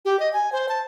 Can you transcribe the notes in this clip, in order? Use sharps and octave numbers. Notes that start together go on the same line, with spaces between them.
G4
D#5
G#5
C5
A5